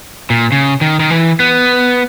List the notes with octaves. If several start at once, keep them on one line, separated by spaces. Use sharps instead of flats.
A#2
C#3
D#3
D#3
E3
B3